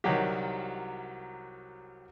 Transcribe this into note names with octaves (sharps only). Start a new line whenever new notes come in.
C2 D#3 F#3 G3 F#4 G4